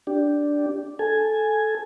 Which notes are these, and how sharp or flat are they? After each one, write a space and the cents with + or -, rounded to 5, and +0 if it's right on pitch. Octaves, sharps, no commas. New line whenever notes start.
D4 -5 G4 +0
A4 -10 G#5 +0